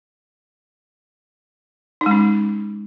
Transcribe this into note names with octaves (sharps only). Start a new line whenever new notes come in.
D#4
G#3
C#4